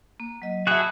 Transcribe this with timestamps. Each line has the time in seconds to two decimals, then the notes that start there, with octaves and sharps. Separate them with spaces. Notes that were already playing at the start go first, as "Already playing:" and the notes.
0.20 A#3
0.42 F#3 D#5
0.67 F#4 G#4 E5 A5 B5 F#6